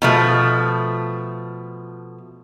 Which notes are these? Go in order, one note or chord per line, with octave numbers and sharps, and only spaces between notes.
B2 F3 A3